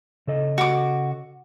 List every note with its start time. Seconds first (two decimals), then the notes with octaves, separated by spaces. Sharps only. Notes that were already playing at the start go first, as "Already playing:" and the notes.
0.27 C#3 A4 D#5
0.58 F#4 D6